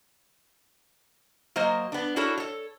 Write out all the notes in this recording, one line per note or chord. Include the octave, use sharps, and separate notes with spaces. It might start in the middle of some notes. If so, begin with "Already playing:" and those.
F#3 A#3 C5 D#5
B3 D4
D4 E4 F#4 A4 A#4 C#5
A4 C#5